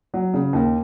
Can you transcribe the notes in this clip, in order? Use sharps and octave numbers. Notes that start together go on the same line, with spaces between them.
F#3
C#3
D#2